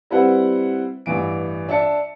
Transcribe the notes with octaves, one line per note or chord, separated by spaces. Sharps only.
G3 C4 E4 B4 C5 F#5
A1 G2 E3 D7
D4 E5 A5 C#7